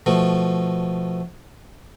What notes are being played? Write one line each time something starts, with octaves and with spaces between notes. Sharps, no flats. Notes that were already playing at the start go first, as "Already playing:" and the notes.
B2 F3 A3